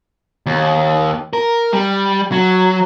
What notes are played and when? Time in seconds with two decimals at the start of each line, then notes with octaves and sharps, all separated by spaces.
0.46 D#2
1.33 A#4
1.73 G3
2.32 F#3